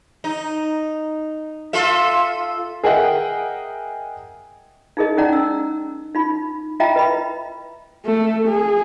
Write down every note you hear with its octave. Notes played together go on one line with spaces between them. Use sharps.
D#4
F4 A4 E5
G#4 A#4 D#5 E5 F#5 G5
D#4 E4 G#4 A#4 D#5
C#4 D#4 D5 F#5 A#5
E6
D#4 F4 B5
E4 F4 D#5 E5 G5 A#5
B4 D#5 B5
A3
G#4